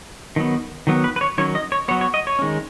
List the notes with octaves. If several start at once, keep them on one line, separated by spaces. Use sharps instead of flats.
D#3 F#3 B3
D#3 F#3 B3
B4
B4
C#5
D#3 F#3 C#4 C#5
D#5
C#5
F#3 B3 C#5
C#5
D#5
C#5
D#3 G#3 C#4